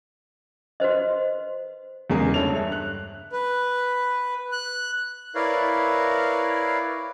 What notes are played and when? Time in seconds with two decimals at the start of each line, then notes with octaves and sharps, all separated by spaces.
0.80 F#4 B4 C5 D#5
2.10 E2 C#3 G#3 A#4
2.34 G2 A4 C#5 E5 F7
2.72 F#6
3.32 B4
4.52 F#6
5.35 E4 A#4 B4 C#5 D5 F5